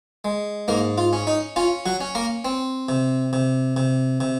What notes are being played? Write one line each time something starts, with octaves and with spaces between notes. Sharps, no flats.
G#3
G#2 A#3 A#4
F4
C#4
D#4
C#4 F4
F#3 F#4
C#4
A#3 A#4
C4
C3
C3
C3
C3